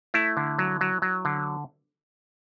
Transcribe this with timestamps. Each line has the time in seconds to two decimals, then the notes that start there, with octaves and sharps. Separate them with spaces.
0.14 A3 E4
0.37 D3
0.59 F#3
0.81 F#3
1.02 F#3
1.25 D3